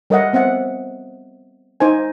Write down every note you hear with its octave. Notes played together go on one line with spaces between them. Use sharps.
G3 A#4 C#5 D#5 E5 F#5
B3 C4 E5 F#5
D#4 C5 G#5